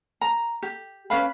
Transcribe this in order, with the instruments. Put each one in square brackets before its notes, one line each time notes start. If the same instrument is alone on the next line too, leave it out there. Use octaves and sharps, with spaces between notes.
[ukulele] A#5
G4
C#4 B4 F5 B5